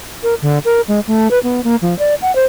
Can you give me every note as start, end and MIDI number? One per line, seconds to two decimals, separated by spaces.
0.23 0.34 70
0.42 0.58 50
0.65 0.81 70
0.88 1.00 56
1.07 1.30 57
1.31 1.39 71
1.43 1.63 59
1.64 1.76 58
1.82 1.97 53
1.99 2.14 74
2.22 2.34 78
2.35 2.45 72